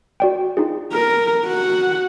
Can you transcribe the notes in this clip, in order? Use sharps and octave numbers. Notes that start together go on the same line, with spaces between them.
F#4 D5 G5
D#4 F4 G#4
A#4 F6
F#4 F#5